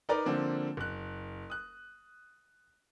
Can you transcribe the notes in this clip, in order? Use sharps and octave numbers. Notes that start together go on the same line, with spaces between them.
D#4 A#4 B4 D5 A#5 D6
D3 F3 A#3 C4 D4
F#1 F#6
D#6 F#6